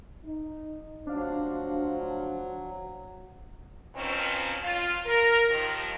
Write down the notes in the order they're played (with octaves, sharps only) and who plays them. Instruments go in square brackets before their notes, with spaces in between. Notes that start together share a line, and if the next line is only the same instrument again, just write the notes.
[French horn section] D#4
[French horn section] D2 F3 C5 [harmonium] F#3 [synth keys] D4 F5
[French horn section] B2 D#3 F3 C4 C#4
F4
A#4
D#2 D#3 F3